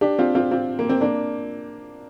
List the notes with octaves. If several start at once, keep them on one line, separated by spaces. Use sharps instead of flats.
D4 G4
C4 F4
C4 F4
C4 F4
A#3
C4
A#3 D4